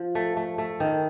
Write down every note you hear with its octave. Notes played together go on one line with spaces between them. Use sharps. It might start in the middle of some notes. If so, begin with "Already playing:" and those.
Already playing: F3
A3
A3
A3
D#3